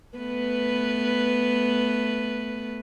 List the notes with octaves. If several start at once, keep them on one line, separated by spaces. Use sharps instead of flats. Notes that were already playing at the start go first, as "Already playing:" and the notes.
A3 B3 B4